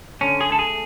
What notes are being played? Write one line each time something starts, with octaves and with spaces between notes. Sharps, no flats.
D3 C#4
G#4
A3 A4
G#4